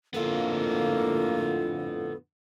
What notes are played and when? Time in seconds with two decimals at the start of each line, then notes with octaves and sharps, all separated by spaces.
0.14 F2 A2 D3 A#3 B3 F4 A4